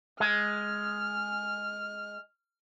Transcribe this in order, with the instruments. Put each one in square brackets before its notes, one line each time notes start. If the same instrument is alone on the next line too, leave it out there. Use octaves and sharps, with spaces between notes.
[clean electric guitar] G#3 [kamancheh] F6